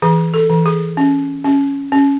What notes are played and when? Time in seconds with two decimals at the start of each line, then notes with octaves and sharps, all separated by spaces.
0.02 E3 G#4
0.34 A4
0.50 E3
0.66 G#4
0.97 C#4
1.45 C#4
1.92 C#4